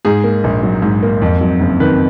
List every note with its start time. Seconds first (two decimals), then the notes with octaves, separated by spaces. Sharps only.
0.05 G#2 G#4
0.24 A#3
0.44 A#1
0.63 F#3
0.82 G#2
1.03 A#3
1.22 F2
1.41 F#3
1.61 F#1
1.80 D#3 B4